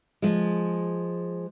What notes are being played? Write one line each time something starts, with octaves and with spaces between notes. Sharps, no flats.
F3 G#3